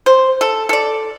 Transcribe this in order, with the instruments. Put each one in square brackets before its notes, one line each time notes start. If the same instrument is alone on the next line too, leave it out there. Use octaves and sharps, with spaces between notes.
[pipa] C5
A4
A4 D5